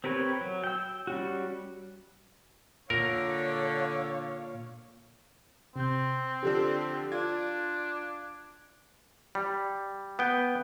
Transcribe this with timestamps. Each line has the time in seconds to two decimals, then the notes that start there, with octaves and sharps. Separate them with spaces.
0.04 C4 G4 A#4 B4 C#5
0.41 F#3
0.64 G5 E6
1.07 G3 C#4 F#4
2.90 A#2 D3 A#4 C#5 F5
5.76 C3 C4 G6
6.43 D3 F3 D4 G4 A4 E6
7.12 D4 F4 D5 G#6
9.35 G3
10.19 B3 G5